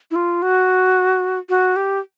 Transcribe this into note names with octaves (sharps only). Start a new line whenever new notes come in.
E4
F4
F#4
F#4
G4